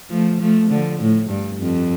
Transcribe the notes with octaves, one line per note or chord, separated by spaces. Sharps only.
F3 A3
F3 A3
D3 F3
A2
G2
F2